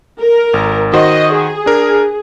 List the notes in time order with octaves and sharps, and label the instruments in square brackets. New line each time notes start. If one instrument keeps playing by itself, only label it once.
[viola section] A#4
[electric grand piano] G#1
[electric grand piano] D#3 F#4 C5 [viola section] D#5
[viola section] G#4
[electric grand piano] D4 A#4